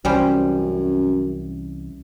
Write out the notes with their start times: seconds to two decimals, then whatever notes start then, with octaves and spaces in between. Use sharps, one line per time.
0.05 C2 F#2 E3 G3 C#4 C5